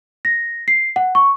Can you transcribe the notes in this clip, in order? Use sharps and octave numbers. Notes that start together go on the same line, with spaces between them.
A#6
C7
F#5
C#6